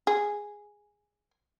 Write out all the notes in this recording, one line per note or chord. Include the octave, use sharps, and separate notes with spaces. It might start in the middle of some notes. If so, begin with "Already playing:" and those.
G#4